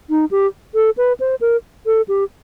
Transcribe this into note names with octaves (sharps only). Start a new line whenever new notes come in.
D#4
G4
A4
B4
C5
A#4
A4
G4